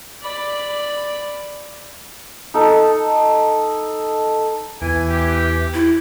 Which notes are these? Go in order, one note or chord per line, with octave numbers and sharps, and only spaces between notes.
D5 B5
D#4 A4
E2 E3 G#5
G4
E4